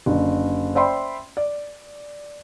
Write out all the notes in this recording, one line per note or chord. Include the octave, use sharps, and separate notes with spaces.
F#1 D3
C5 D5 E5 G5 B5 C6
D5